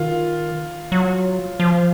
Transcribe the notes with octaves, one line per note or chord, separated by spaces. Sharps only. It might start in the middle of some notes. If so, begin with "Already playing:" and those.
Already playing: D#3 F4
F#3
F3